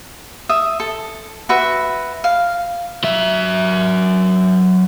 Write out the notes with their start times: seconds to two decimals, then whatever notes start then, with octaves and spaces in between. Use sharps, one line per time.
0.49 E5 D#6
0.80 A4
1.49 F#4 B4 E5
2.24 F5
3.04 F#3 E5